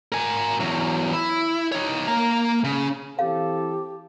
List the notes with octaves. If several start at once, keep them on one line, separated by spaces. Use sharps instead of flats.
A#4 G#5
E2 F#3
E4
D#4 C#5
A#3 A#5
C#3
E3 C4 G4 A4 F5